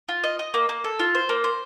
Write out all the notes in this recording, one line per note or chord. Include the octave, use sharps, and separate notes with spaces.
F4
D#5
D#5
A#3
A#3
A4
F4
C5
A#3
C5